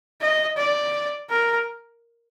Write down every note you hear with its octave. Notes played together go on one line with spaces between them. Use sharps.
D#5
D5
A#4